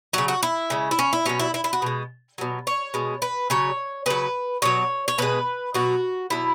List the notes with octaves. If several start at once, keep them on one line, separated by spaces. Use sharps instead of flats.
C#3 F#3 F#4
F#4
E4
C#3 G#3
E4
C#4
E4
B2 F#3 C#4
E4
E4
E4
F#4
B2 G#3
B2 F#3
C#5
B2 G#3
B4
C#3 F#3 C#5
C#3 F#3 B4
B2 F#3 C#5
C#5
B2 G#3 B4
B2 F#3 F#4
B2 F#3 E4